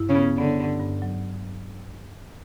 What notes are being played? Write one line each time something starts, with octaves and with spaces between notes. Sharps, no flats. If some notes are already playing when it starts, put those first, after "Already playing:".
Already playing: G2 E4
C#3 C#4
B3
D3 B3
G2
G2
F#3